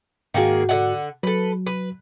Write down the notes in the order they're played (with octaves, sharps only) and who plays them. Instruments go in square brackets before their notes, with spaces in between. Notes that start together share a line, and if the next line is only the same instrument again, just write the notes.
[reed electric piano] G#2 F#4 [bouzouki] D#3 A#3 G#4
[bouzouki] D3 E4 F#5
[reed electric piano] F#3 [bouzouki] A4 B4
[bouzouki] B4